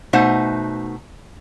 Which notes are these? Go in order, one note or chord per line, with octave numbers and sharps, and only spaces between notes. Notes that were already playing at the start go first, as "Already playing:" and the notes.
B2 A3 D#4 C5 F#5